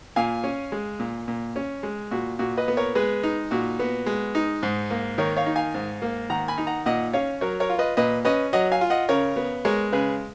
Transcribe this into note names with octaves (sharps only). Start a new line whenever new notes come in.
A#2 F5 G#5
C#4
G#3
A#2
A#2
C#4
G#3
A#2 F#4
A#2 F#4
B4 D#5
B3
A#4 C#5
G#3 G#4 B4
D#4
A#2 F#4
B3
G#3
D#4
G#2
A#3
D#3 A#4 C#5
C#5 F5
D#4
F5 G#5
G#2
A#3
D#3 F#5 A#5
G#5 B5
D#4
F#5 A#5
A#2 D#5 F#5
C#4 C#5 F5
F#3 A#4 C#5
A#4 C#5
F4
B4 D#5
A#2 B4 D#5
C#4 B4 D#5
F#3 D#5 F#5
F5 G#5
F4
D#5 F#5
C#3 A#4 C#5
B3
G#3 A#4 C#5
C#3 G#4 B4